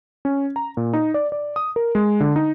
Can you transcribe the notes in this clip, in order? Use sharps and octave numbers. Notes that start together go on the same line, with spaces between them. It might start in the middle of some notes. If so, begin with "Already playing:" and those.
C#4
A#5
A#2
D#4
D5
D5
D#6
A#4
G#3
D3
D#4